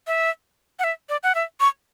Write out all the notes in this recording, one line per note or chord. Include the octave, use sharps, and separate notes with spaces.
E5
F#5
E5
D5
F#5
E5
C#6